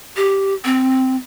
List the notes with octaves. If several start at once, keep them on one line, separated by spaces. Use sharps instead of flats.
G4
C4